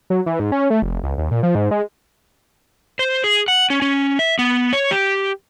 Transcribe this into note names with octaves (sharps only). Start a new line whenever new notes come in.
F#3
E3
G#2
C#4
A3
F1
C#2
D#2
A#2
F3
G#2
G#3
C5
G#4
F#5
C#4
C#4
E5
B3
C#5
G4